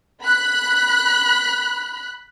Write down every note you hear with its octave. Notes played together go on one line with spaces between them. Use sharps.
B5 F#6